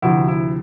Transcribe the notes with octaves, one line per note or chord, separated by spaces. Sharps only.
D2 C3 F3 E4 F#4
E4